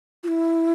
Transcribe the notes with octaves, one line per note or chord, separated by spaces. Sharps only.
F4
E4